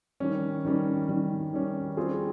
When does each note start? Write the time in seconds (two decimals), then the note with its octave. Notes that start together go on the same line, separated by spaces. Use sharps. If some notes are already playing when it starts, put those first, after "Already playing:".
0.20 D#3 G3 C#4
0.65 D#3 G3 C#4
1.08 D#3 G3 C#4
1.53 D#3 G3 C#4
1.97 G3 C4 F4 G#4